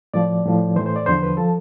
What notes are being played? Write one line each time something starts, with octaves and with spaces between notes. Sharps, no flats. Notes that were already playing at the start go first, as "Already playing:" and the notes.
A2 F3 D5
A2 F3
A2 E3 C5
C5
D5
E2 D3 F3 C5
B4
F3 A4